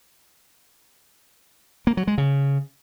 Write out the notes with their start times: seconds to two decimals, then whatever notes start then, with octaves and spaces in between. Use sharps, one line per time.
1.87 A#3
1.97 F#3
2.07 G#3
2.18 C#3